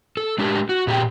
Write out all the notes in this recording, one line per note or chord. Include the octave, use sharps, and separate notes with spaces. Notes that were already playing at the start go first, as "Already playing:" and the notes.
A4
G#3 D4 G4 A#4
F#4
A#2 G4 G#4 G5